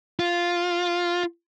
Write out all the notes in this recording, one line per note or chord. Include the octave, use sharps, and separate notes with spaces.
F4